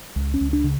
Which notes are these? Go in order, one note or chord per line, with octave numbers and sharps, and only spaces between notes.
C#2
C#4
C#2
D4
C#3